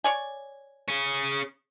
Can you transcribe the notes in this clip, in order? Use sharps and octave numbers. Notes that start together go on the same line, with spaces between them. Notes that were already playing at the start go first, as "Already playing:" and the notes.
C#5 D5 G#5
C#4 G#4